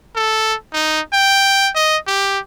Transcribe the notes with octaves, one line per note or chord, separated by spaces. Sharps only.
A4
D#4
G5
D#5
G4